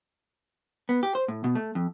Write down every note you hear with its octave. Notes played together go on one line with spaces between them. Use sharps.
B3
G4
C5
A2
B2
A3
F2